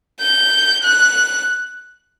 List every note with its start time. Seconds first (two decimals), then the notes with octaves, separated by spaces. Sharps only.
0.20 G6
0.83 F#6